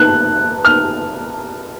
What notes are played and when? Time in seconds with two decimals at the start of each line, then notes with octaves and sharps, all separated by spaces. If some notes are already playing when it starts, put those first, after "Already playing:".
Already playing: F#6
0.65 F6